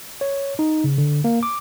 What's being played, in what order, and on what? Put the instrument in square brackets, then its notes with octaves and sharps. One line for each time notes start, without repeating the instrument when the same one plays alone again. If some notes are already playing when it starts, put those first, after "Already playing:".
[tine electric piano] C#5
D#4
C#3
D3
A#3
D6